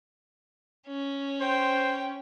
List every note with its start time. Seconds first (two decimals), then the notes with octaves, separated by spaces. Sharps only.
0.88 C#4
1.41 C5 G5